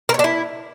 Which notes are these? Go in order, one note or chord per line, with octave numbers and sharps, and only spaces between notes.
A#4
C#5
D4
E4